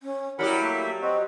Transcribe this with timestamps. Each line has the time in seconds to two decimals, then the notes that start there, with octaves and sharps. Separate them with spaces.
0.02 C#4
0.39 F#3 G3 E4 G4 A#4 F#5 B5
0.62 A3 A#3 E5
1.02 C4 F#4 D#5